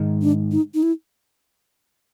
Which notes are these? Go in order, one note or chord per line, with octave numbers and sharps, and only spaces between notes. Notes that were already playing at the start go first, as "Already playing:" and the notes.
Already playing: G#2 D#3 G#3
D4
D#4
D#4
E4